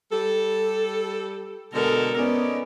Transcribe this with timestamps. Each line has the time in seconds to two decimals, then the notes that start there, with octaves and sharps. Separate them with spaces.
0.11 G3 A4
1.73 B2 D3 G#3 A4 A#4
2.17 B3 C#4 D#4 D5